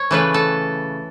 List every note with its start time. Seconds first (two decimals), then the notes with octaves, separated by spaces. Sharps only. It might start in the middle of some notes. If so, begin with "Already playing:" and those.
Already playing: C#5
0.11 C#3 E3 A3 B4
0.34 A4